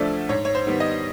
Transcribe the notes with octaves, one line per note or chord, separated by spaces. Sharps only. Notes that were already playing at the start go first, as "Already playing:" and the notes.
Already playing: D2 D3 F3 A3 D5
G#2 C#5
C#5
C5
D#3 G3 B3
D#5